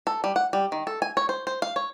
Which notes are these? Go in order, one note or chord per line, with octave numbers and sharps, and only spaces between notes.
A4
G3
F#5
G3
D#3
A4
G#5
C#5
C5
C5
F5
C#5